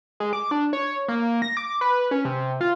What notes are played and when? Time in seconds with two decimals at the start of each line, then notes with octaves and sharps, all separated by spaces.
0.20 G#3
0.33 D6
0.51 D4
0.73 C#5
1.08 A#3
1.42 A#6
1.57 D6
1.81 B4
2.11 C#4
2.25 C3
2.61 F4